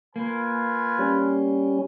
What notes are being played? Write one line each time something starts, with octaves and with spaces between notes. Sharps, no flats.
A#3 F4 B4 G#5
G3 C#4